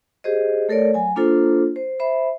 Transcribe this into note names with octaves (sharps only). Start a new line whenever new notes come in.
G4 G#4 C5 D#5
A3 A4 A#4 C#5 D5
F#3 G#5
A#3 D4 F4 A4 C5
C5
C5 E5 B5